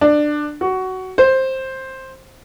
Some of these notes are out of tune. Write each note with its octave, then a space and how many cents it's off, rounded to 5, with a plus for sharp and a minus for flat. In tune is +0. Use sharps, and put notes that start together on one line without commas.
D4 +20
F#4 +15
C5 +10